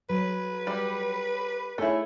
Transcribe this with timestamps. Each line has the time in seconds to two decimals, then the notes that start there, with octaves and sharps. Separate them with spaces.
0.09 F#3 B4
0.67 G3
1.78 A3 D#4 E4 G#4 C#5